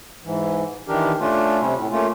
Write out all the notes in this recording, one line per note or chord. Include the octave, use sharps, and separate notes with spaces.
G#2 E3
D#3 E3 D4 G4 A#4
A3 C#4 D4 F4
C3 G3 C#4
A2
A3 A#3 C#4 F4